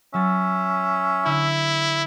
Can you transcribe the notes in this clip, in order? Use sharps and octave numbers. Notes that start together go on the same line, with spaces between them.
F#3 C#4 E5 E6 A6
D3 E4